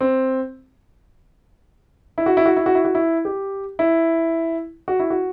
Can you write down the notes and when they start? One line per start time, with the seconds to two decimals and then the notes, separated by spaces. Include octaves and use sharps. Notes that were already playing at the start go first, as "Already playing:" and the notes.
0.01 C4
2.18 E4
2.26 F#4
2.37 E4
2.46 F#4
2.56 E4
2.66 F#4
2.75 E4
2.85 F#4
2.95 E4
3.25 G4
3.79 E4
4.88 F#4
5.00 E4
5.10 F#4